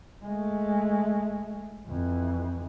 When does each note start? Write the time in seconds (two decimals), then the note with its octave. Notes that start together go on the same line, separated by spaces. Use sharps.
0.23 G#3 A3
1.87 F2 E3